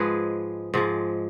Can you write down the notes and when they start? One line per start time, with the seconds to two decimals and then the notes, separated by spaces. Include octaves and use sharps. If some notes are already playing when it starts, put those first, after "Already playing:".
Already playing: G#2 F3 G#3 G#4 B4
0.74 G#2 F3 G#3